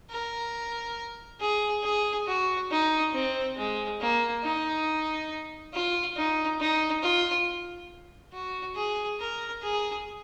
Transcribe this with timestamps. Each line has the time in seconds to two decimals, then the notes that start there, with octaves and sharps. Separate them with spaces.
0.10 A#4
1.41 G#4
1.83 G#4
2.27 F#4
2.71 D#4
3.13 C4
3.57 G#3
4.00 A#3
4.43 D#4
5.73 F4
6.16 D#4
6.60 D#4
7.02 F4
8.33 F#4
8.75 G#4
9.20 A#4
9.62 G#4